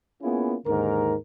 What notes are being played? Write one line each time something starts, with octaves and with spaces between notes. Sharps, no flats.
A#3 B3 C#4 E4 F4 G#4
D#2 G#2 D3 A#4